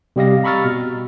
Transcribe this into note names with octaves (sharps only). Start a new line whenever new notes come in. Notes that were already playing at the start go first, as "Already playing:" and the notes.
C3 G3 G4 D#5 F5 A#6
A#5 B5 C#6 E6 F6 A6
B2